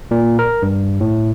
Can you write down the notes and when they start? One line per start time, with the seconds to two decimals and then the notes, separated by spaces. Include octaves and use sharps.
0.11 A#2
0.39 A#4
0.62 G2
1.01 A2